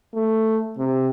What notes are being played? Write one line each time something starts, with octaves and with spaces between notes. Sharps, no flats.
A3
C3